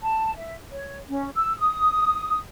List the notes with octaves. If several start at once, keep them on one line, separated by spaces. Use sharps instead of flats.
A5
E5
C#5
C#4
E6
D#6